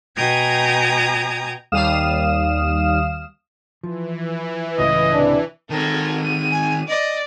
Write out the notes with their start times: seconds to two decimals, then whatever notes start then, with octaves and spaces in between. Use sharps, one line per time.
0.16 B2 G5 G#5 A#5 D#6 G#6
1.72 D#2 G3 F5 D#6 F6 E7
3.83 E3 F3
4.78 C#2 A2 D#5
5.12 C3 D4
5.70 D#3 C4 A4 A#4 C#5
6.21 D#7
6.51 G#5
6.88 D5 D#5